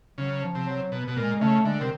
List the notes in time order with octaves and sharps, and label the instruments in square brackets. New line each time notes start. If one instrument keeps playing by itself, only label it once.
[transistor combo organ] C#3 [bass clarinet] F#3
[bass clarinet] F3
[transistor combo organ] C3
[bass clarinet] F#3
[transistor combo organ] B2
B2
[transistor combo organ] A#2 [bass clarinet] G#3
[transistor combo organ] C#3 [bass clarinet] A3
[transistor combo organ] D3 [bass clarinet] G#3
[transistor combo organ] C3 [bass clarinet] D#3